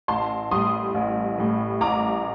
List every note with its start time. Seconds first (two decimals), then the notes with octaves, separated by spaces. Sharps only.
0.08 A1 A5 C6
0.51 A2 G3 C6 D#6
0.95 A1
1.38 A2 G3
1.81 A1 A#5 D6